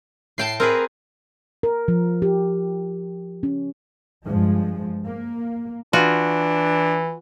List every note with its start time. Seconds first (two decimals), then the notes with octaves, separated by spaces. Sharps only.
0.38 A2 G5 A5 C7
0.60 C4 G#4 A#4 B4
1.63 A#4
1.88 F3
2.22 G4
3.43 C#4
4.26 G2 F3 G#3
5.04 A#3
5.93 E3 D4 F4 F#4